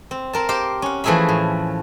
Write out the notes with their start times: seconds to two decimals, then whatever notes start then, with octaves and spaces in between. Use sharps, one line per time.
0.11 C4
0.33 C4 A#4 A5
0.49 G4 C5 F5 G5
0.82 C#4 F#5
1.04 E3 F3 A3 G#4 E5 B5
1.29 A2